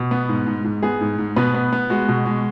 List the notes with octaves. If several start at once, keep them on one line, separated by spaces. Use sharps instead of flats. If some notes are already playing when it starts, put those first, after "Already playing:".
Already playing: B2
B3
G#2
G#2
G#2
B3 G#4
G#2
G#2
B2 B3 B4
B3
B3
G#3 F#4
B2
G#3